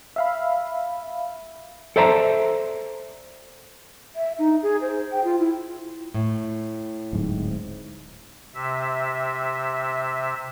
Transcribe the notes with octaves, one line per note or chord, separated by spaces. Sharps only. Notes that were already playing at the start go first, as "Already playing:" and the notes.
E5 F5 B5
A4 C5 D5 E5 A5 A#5
E5
D#4
G#4
C5
G5
F4
E4
A2
D1 G#2
C3 E5